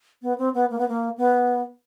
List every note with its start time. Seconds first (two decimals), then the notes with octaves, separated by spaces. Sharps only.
0.22 B3
0.38 C4
0.54 B3
0.70 A#3
0.78 B3
0.88 A#3
1.18 B3